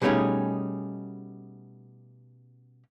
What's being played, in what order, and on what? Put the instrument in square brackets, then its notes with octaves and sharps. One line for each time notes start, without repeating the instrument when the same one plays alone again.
[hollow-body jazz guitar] B2 G3 A3 C#4 D#4 G#4